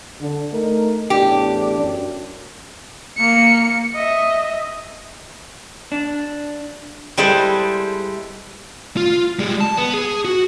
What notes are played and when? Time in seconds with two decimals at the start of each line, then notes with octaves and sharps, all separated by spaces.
0.20 D3
0.52 A3 D#4 A#4
1.10 E2 A2 D4 G4
1.79 F#2
3.18 A#3 C#7
3.95 D#5 E5
5.92 D4
7.18 G3 G#3 E4 A4 B4 C5
8.97 F4
9.39 G3 G#3
9.61 A5
9.78 B3
9.94 G#4
10.25 F#4